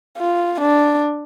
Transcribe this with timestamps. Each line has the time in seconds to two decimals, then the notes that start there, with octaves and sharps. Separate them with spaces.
0.18 F4
0.61 D4